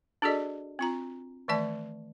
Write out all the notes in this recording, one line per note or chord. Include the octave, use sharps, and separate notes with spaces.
D4 F#4 G#4 A4 D5 D#5
C4 F4 A#5
D#3 E3 A3 D5 A5